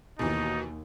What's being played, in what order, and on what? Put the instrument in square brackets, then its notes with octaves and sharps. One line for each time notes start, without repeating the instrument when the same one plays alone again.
[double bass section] D#2 [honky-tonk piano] B2 E3 [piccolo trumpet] D#4 [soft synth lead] F#4